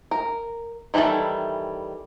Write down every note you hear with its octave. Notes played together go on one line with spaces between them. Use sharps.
A#4
D#3 E3 G3 E4 A4